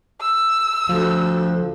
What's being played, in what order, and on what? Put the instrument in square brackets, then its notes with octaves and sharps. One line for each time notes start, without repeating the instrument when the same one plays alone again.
[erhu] E6
[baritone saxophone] D2 [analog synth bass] F3